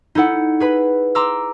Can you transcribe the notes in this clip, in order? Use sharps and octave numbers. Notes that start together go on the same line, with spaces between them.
D#4 E4 A4 F#5
G#4 B4 B5
A#5 C6 D6 E6